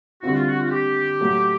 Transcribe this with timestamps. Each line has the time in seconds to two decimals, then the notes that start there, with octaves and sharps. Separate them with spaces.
0.22 D3 G3 C4 E4 F#4
0.35 F4
0.47 F#4
0.59 F4
0.66 F#4
0.71 G4
1.20 A2 F#3 A3